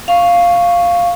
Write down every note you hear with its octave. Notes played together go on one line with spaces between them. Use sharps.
F5 C#6